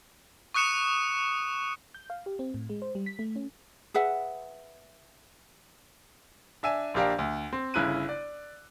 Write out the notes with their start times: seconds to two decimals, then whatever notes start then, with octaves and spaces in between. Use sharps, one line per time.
0.54 C#6 D#6 F#6 C#7 E7
1.94 G6
2.10 F5
2.26 G4
2.39 C4
2.54 A2
2.70 G#3
2.82 C5
2.95 G3
3.06 B6
3.19 A3
3.36 C#4
3.94 G#4 B4 E5 F#5
6.63 D4 E5 G#5 D#7
6.94 A#1 A#3 D4 G4 A#4 F5
7.19 D2
7.53 C4
7.74 G1 C#3 E4 F#6 D#7
8.09 D5